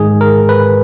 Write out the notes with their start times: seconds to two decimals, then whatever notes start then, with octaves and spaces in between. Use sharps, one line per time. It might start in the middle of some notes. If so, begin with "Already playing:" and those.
Already playing: G#2 D#3 G#3 G#4
0.21 A#4
0.49 B4